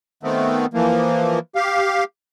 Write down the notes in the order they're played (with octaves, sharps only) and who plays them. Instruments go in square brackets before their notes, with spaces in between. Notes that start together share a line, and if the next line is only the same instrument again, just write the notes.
[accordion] D#3 A3 B3 C4
E3 F3 A#3
G4 F5